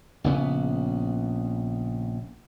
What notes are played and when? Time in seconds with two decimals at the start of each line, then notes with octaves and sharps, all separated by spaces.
0.24 A#1 C#3 B3